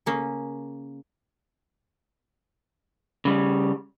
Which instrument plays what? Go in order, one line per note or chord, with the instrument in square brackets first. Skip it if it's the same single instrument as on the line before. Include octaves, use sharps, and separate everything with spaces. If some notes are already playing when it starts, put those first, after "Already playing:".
[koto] C#3 A#3 C#4
[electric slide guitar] C#3 G3